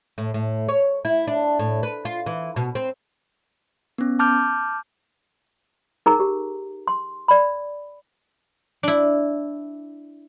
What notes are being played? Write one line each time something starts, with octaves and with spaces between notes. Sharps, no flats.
A2
A2
C#5
E4
D4
A2
B4
F4
E3
B2
C4
B3 C#4
A5 D6 F6 G6
D#4 G#4 A#4 A#5
G4
C6
D5 B5
D4 E4